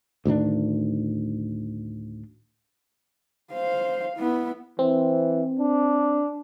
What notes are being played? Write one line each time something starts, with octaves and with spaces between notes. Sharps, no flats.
D2 A2 D#3 D4
C5 F5
B3 E4
E3 C4
D4